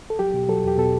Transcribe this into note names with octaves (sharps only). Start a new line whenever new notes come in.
A4
F#3 G4
B2
F#3 A4
E2 G4
B2 A4